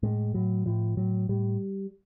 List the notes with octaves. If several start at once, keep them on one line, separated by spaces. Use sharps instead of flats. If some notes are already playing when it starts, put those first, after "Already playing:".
A2 G#3
A2 F#3
A2 F3
A2 F#3
A2 G3